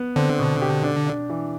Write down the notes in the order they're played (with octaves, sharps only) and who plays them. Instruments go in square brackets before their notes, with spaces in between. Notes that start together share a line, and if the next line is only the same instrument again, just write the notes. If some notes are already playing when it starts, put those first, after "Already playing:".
Already playing: [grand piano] B3
[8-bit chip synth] D3 [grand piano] C4
[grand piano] B2
G4
D4
D4
E3